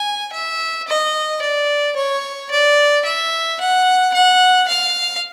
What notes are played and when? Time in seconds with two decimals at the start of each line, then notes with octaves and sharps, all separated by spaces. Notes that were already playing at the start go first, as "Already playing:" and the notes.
Already playing: G#5
0.33 E5
0.87 D#5
1.42 D5
1.96 C#5
2.51 D5
3.05 E5
3.60 F#5
4.14 F#5
4.68 F5